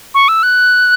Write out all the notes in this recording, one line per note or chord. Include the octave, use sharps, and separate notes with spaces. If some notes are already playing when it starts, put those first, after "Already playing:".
C#6
E6
F#6